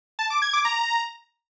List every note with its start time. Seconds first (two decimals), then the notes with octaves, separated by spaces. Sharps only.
0.19 A5
0.30 D6
0.42 G#6
0.53 D6
0.65 A#5